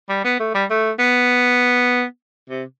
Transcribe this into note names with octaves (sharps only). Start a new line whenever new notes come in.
G3
B3
A3
G3
A3
B3
C3